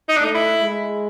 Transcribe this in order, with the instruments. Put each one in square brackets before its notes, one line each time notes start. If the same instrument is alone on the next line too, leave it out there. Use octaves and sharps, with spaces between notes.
[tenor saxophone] D#4
D4
[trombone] A3 [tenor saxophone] D#4
[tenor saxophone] E4
[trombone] G#3